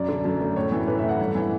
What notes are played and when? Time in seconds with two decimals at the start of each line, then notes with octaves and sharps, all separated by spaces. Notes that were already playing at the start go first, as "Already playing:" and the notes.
Already playing: F#2 D5
0.08 D3
0.24 F#2
0.41 A3
0.56 A2 C#5
0.72 E3
0.88 A2 B4
0.98 E5
1.03 A3
1.09 F#5
1.20 G2
1.35 E3